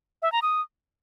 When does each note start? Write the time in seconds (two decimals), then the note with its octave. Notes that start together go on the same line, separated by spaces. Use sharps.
0.22 E5
0.32 A#5
0.42 D#6